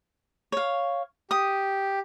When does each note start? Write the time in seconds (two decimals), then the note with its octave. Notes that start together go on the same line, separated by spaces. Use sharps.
0.52 C#5 F5
1.31 G4 D#6